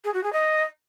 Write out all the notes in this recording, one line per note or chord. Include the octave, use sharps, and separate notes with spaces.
G#4
F#4
G#4
D#5